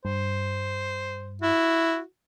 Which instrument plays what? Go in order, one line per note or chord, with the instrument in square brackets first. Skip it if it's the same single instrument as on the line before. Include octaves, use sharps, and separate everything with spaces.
[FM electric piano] G2 [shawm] C5
[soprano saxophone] E4 [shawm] F#4